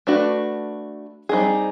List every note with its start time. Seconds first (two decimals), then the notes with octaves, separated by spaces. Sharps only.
0.07 A3 D4 F#4 B4
1.29 G3 C4 D#4 G#4